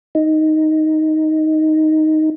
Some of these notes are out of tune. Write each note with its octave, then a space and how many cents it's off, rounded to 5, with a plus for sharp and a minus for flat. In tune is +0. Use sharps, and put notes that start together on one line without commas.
D#4 +5